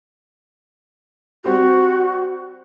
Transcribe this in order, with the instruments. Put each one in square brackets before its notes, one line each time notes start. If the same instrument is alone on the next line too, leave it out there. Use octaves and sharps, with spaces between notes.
[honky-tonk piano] G3 C4 G4 [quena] F#4